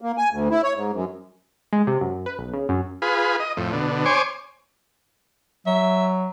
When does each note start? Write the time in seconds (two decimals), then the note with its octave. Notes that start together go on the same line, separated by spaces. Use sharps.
0.01 A#3
0.18 G#5
0.31 D2
0.50 E4
0.63 C#5
0.75 G#2
0.93 F#2
1.73 G#3
1.87 C3
2.01 F#2
2.26 B4
2.39 B1
2.53 C#3
2.69 F#2
3.02 F4 G#4 B4
3.40 D#5
3.57 F2 A2
3.73 B2 D3
4.05 C5 C#5 G#5 D6
5.66 F#3 E5